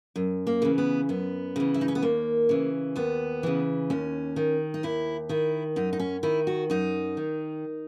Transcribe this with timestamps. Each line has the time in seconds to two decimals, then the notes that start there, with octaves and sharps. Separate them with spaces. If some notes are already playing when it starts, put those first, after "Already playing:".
0.16 F#2
0.47 A#3
0.62 C#3 E3
0.78 B3
1.09 F#2 B3
1.56 C#3 E3
1.74 E4
1.81 D#4
1.88 C#4
1.95 B3
2.02 D#2 A#3
2.49 C#3 E3
2.96 D#2 B3
3.43 C#3 E3
3.90 D#2 C#4
4.36 D#3
4.74 D#4
4.83 D#2 E4
5.29 D#3 E4
5.76 F#2 D#4
5.93 D#4
6.00 C#4
6.23 D#3 E4
6.47 F#4
6.70 F#2 D#4
7.17 D#3